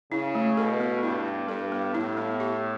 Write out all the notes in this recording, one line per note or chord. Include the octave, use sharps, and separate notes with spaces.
C#3 E4
A3
B2 A4
B3
G2 E4
B3
G2 A4
B3
A2 E4
B3
G4